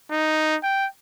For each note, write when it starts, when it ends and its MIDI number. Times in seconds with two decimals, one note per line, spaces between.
0.11 0.56 63
0.63 0.86 79